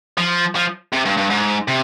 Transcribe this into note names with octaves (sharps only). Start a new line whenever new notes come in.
F3
F3
C3
G2
G2
G#2
C3